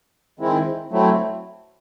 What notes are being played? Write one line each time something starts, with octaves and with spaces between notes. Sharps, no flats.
D#3 G#3 C4 E4
F#3 A3 C4 E4